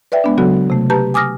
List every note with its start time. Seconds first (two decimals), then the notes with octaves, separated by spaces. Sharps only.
0.12 B4 D5 E5 G5
0.24 G#3 B3 D4
0.38 C#3 F#3 B3 F#4 A4
0.70 C3 A3
0.90 G4 B4 A5 A#5 G6
1.14 G#5 D6 D#6 F6 A#6